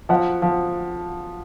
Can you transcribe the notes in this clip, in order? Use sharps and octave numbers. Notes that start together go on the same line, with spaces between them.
F3 F#5
F3